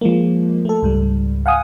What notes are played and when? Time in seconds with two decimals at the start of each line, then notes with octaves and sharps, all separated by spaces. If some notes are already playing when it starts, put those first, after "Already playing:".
0.01 F3 G#3 A#3
0.65 A3 A4
0.82 C#2 G#2 G3
1.46 F5 F#5 G#5 D#6